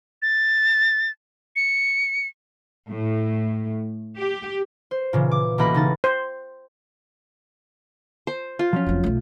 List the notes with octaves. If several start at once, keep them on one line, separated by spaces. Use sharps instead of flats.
A6
C#7
A2
G4
C5
A#2 C#3 E3
D6
A1 B2 A#3 D#5 B5
C#3 D#4 A6
C5
C5
F4
F3 F#3 C#4
F1 C4
B1 A3